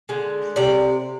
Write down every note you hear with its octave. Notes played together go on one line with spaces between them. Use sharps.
D3 G#3
C3 D5